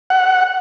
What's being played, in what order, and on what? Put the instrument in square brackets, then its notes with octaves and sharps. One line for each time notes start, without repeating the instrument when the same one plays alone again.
[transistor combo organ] F#5